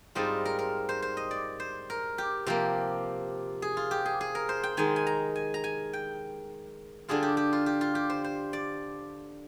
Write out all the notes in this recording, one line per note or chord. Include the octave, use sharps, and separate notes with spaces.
G#2 G3 C4 F4 D#5
A#4
A#4
C5
C5
D#5
D5
C5
A#4
G4
C3 F3 A#3 G4
G#4
F4
G4
G#4
G#4
A#4
C5
G5
D#3 G#3 D#4 G#5
G#5
A#5
G#5
A#5
G#5
G5
D3 G3 D4 F4 G#4
G4
G4
F4
G4
F4
G4
C5
C5
D5